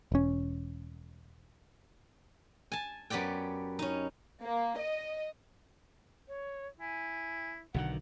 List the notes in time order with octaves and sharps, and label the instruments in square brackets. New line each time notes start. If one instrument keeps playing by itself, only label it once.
[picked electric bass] E1 C#4
[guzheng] G#5 A5
F#2 B3 G4 D5 G5
C#4 D#4
[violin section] A#3
D#5
[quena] C#5
[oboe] E4 [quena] G#5
[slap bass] B1 D3 D#3 [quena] F#5